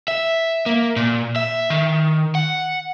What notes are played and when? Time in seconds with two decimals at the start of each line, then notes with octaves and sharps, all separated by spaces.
0.08 E5
0.66 A#3
0.96 A#2
1.36 E5
1.70 D#3
2.35 F#5